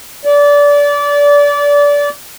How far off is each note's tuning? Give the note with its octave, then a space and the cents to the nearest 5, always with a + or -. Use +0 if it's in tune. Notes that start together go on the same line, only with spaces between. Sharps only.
D5 -25